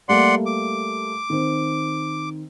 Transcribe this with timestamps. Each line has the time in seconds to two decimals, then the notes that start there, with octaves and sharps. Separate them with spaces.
0.09 G3 A3 A#3 D5 F#5 C6
0.46 D6
1.30 D#3 C4